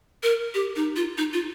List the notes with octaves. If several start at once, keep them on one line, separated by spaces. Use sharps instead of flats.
A#4
G4
D#4
F4
D#4
F4